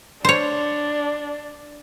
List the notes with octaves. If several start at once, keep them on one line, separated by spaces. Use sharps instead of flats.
D4 C5 C#5